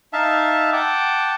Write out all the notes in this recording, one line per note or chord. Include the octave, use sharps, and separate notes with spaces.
D#4 E5 F5 A5
F#5 G5 A5 D6